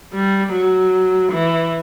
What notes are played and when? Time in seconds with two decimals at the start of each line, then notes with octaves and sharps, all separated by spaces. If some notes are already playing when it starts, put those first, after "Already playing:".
0.14 G3
0.53 F#3
1.33 E3